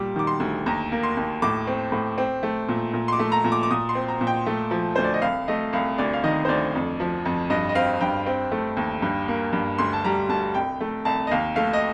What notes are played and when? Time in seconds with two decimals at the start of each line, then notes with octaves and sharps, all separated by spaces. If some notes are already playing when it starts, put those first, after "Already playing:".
Already playing: A#2 G3 D6
0.16 D#3 D6
0.27 C6
0.40 D2
0.66 D#2 A#5
0.92 A#3
1.03 C6
1.17 D#2
1.42 A2 D6
1.67 C4
1.92 A2
2.18 C4
2.43 A3
2.69 A#2
2.94 A#2
3.08 C6
3.13 D6
3.19 A3
3.32 A#5
3.44 A#2
3.52 D6
3.63 D6
3.71 A#2 D#6
3.89 C6
3.95 C4
4.08 A#5
4.21 A#2
4.27 G5
4.46 A3
4.71 F3
4.96 D2 C5
5.04 D5
5.14 D#5
5.22 C2 F5
5.48 A3 D#5
5.73 C2 F5
5.98 D2 D5
6.14 F5
6.24 D#3 D#5
6.45 C5
6.49 D2 D5
6.75 F2
7.00 F3
7.25 F2
7.50 G2 D#5
7.69 D#5
7.75 C4 F5
8.01 G2 G5
8.26 C4
8.52 A3
8.77 D#2
9.02 G2
9.28 A#3
9.53 G2
9.78 D2 C6
9.93 A5
10.04 G3 A#5
10.29 D2 A5
10.54 C2 G5
10.81 A3
11.05 C2 A5
11.27 D#5
11.31 D#2 F5
11.56 A3 F5
11.73 D#5